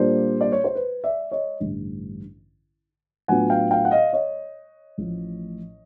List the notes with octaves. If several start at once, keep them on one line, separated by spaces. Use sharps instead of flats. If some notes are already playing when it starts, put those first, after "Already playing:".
Already playing: A#2 G3 A#3 D4 F4 C5 D5
D5
C#5
C5
B4
D5 E5
C#5 D#5
A1 G2 D3
A2 F#3 B3 D4 F4 F#5 G#5
F5 G5
F5 G5
F#5
D#5 F5
C#5 D#5
A1 A2 F3